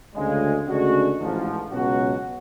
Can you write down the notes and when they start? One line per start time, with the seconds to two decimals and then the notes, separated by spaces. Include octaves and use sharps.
0.14 D2 C#3 G#3
0.67 D2 C#3 G#3 D4 F#4
1.19 A1 G#2 F3
1.72 C#2 B2 F#3 C#4 F#4